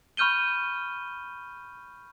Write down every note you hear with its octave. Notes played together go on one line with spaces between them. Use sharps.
B5 C#6 F6 G6 D#7 G7